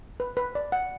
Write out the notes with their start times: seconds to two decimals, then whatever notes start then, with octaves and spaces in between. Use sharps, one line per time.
0.20 B4
0.37 B4
0.55 D5
0.72 F#5